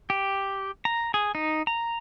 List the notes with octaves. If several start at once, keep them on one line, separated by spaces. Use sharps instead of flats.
G4
A#5
G#4
D#4
A#5